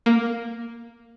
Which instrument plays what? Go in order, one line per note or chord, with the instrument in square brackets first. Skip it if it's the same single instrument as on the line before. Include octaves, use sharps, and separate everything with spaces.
[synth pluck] A#3